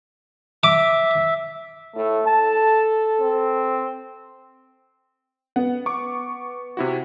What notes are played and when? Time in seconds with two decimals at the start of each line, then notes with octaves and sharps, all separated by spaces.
0.64 E5 D6
1.96 A2 A3
2.27 A4 A5
3.21 C4
5.56 B3 F#5
5.86 C#6 D6
6.77 C3 E4 F#4